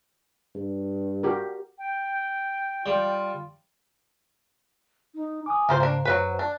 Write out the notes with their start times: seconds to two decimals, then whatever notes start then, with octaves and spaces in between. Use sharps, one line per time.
0.55 G2
1.23 F#4 G4 A#4
1.78 G5
2.86 G3 F4
5.15 D#4
5.46 G#5 D6 D#6
5.69 G#2 C#3 A#3 F4 C5
5.80 A#3 D4 C5
6.05 F#2 F#3 A#3 B4 C#5 F#5
6.39 D4 A5